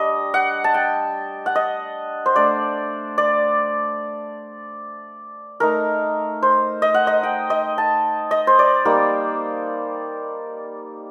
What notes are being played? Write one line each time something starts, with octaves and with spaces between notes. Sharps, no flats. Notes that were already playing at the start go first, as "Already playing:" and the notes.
Already playing: G3 D4 D#5
F#5
A5
G5
F#5
D#5
C5
A3 D4 D5
D5
A3 D#4 A#4
C5
D#5
F#5
D#5
G5
D#5
A5
D#5
C5
D5
G3 A#3 D#4